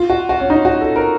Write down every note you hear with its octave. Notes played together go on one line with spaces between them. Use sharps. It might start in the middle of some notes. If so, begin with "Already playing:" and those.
Already playing: F4
F#4
F#4
C#4
D#4
F#4
A4
A#4